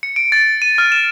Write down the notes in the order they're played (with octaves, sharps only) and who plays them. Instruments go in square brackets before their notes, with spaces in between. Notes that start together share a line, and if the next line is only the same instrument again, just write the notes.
[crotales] C#7
D7
A6
D#7
F6
E7